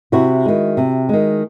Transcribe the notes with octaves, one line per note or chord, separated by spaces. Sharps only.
C3 E4 F#4
D#3 G#3
C3
D#3 G#3